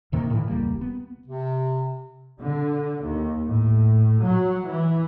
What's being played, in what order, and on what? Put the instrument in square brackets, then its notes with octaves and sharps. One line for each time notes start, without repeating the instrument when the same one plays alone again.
[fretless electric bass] D#2 C3 D#3 A#3
A2 D3 E3 F3
E1 C#2 G3 A#3
B3
[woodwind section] C3
[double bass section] D3
D#2
A2
F#3
E3